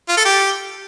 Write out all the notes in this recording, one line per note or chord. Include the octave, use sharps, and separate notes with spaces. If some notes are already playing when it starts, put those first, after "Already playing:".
F4
A4
G4